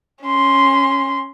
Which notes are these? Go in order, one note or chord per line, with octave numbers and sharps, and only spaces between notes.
C#4 C6